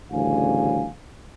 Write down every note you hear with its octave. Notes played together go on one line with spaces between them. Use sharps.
A1 D2 C#3 G3 F5 G#5